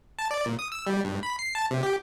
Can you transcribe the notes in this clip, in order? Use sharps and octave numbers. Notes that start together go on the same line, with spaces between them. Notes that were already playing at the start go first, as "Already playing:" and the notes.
A5
D5
A#2
D#6
E6
G3
G2
B5
C7
A5
C3
G4